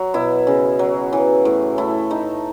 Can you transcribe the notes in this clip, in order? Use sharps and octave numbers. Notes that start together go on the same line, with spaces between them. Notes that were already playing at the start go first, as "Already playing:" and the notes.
Already playing: F#3
B2 E4
C#3
F#3
E3
A2
A3 E4
A3 D#4